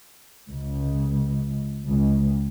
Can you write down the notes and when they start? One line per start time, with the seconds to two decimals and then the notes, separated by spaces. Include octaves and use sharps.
0.49 C#2
1.87 C#2